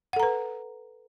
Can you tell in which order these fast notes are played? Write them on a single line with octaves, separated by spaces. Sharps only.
F#5 A4 A#5 B4